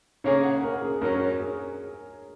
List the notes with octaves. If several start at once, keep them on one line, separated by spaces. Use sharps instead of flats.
C#3 A#3 C#4 G#4 C#5
F#5
A#4
G#4
F#2 F#3 C#4 A#4
C#5
G#4